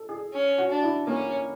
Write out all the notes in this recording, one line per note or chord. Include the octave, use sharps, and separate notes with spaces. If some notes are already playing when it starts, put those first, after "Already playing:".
Already playing: A4
G#4
C#4
F#4
D4
E4
A#3 C#4